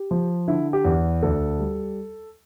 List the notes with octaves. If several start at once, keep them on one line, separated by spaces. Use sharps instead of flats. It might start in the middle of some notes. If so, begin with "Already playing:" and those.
Already playing: G4
F3
D3 E4
G4
E2
D2 A4
G3